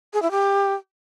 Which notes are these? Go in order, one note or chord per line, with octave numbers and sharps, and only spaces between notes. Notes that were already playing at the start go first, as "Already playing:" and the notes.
G#4
E4
G4